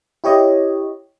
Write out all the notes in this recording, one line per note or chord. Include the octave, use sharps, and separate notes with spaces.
E4 G4 C#5 D#5